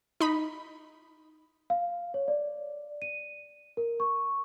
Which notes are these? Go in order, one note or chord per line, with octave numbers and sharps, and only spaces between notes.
D#4 B5
F5
C#5
D5
D#7
A#4
C#6